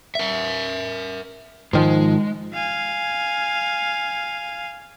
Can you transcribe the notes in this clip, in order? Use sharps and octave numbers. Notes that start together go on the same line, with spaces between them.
A#4 E5
G#2 D#3 F3 G#3
F5 G#5